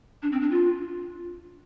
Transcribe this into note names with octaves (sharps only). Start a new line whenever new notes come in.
D4
C4
D4
F4